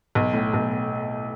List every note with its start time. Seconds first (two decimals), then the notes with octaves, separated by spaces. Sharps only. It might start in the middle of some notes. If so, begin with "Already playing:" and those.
0.15 B1
0.33 A2
0.54 B1